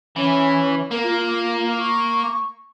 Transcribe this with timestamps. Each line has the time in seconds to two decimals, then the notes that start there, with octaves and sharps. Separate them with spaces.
0.16 E3 C#4
0.91 A#3 A#4
1.04 F4
1.78 C#6